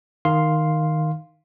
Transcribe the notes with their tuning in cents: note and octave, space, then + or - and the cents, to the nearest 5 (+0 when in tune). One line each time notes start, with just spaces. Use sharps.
D#3 +0 F5 +0 C6 +0